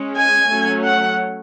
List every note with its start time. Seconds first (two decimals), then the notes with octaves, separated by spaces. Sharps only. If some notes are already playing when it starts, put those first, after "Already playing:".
Already playing: G#3 C#4
0.17 G#5
0.51 F#3 A3 C#4
0.85 F#5